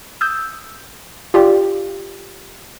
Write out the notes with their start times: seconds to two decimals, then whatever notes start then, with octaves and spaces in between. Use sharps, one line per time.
0.21 D#6 E6 G6
1.34 F4 G4 D5 G5